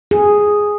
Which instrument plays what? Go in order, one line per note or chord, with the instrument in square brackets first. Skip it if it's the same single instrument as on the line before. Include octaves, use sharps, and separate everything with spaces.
[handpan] G#4